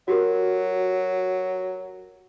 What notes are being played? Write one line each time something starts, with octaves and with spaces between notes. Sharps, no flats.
F#3 F#4 G4 A#4